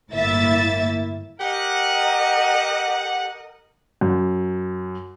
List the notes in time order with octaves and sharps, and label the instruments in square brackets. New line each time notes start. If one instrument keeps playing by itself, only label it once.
[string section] G1 A2 A#3 E4 E5 A6
[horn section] G4 F#5 [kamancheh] A#4 D#5
[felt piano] F#2